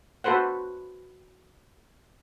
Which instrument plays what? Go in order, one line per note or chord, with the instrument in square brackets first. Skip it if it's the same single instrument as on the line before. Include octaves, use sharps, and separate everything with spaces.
[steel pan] F#4 A4 B4 C5 F#5